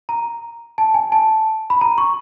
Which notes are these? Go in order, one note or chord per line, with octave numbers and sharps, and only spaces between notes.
A#5
A5
G#5
A5
B5
A#5
C#6